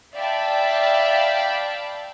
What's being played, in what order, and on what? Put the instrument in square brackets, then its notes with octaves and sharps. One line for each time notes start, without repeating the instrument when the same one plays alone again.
[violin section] D5 E5 F5 G5 A5 B5